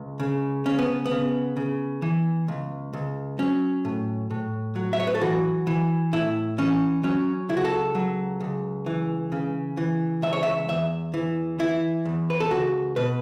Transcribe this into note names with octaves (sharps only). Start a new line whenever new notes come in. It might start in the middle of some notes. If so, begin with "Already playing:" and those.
Already playing: C#2
C#3
C#3 C#4
B3
B3
C#3
C#3
E3
C#2
C#2
F#3 C#4
A2
A2
F#3
E5
C#5
B4
A4
E3 F#4
E3
A2 E4
E3 C#4
F#3 C#4
C#2 E4
F#4
A4
F#3
C#2
E3
C#3
E3
C#2 E5
C#5
E5
E2 E5
E3
E3 E4
E2
B4
A4
C#2 F#4
B2 B4